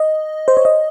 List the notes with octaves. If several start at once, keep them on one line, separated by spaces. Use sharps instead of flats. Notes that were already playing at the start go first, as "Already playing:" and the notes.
Already playing: D#5
C5
C#5
D#5